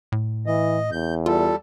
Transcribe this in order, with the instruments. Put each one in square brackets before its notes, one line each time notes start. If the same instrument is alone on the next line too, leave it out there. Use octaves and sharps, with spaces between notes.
[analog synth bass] A2
[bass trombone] E3 [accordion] D#5
[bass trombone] E2 [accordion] G6
[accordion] G3 A4 [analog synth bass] F4